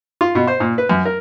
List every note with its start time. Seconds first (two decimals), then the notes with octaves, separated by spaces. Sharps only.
0.21 F4
0.35 B2
0.47 C5
0.60 A#2
0.78 B4
0.89 F#2
1.05 A#4